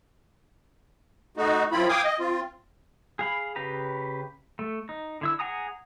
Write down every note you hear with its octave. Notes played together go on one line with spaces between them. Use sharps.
A3 D#4 F#4
F#2 F3 C4 E4 F4 B5
F5 G5 G#5 D6 D#6
D#5
C4 F4
G#4 F5 B5
C#3 G4 B4 A#5
A3
D#4
D3 E4 E6
G#4 F#5 G#5 A#5 D#6